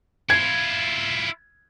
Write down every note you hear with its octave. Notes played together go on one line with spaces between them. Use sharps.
E4 F4 G#6